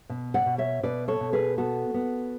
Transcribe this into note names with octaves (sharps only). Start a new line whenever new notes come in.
B2
D5 F#5
B2
C#5 E5
B2 B4 D5
A4 C#5
B2
G#4 B4
B3 F#4 A4
B3